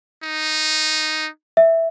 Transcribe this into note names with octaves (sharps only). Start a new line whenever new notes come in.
D#4
E5